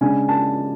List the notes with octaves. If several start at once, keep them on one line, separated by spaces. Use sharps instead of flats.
C#3 G#3 D4 G#5
A5